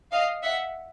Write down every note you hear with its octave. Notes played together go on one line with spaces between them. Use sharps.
D#5 F5
E5 F#5